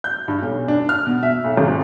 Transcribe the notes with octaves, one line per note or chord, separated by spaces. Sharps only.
G6
G2
B1
D4
F6
B2
E5
B1
G#1